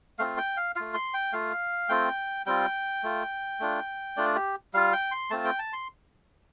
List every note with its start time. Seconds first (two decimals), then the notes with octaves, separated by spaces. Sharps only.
0.19 A3 C4 F4 F5
0.38 G5
0.57 F5
0.76 A3 F4 F5
0.94 C6
1.14 G5
1.33 A3 F4 F5
1.89 A3 C4 F4 G5
2.46 G3 C4 F4 G5
3.03 A3 F4
3.60 A3 D4 F4
4.17 A3 D4 F4 D5
4.36 G4
4.74 G3 F4 F5
4.93 G5
5.11 C6
5.30 A3 C4 F4 A5
5.45 G5
5.59 A5
5.73 C6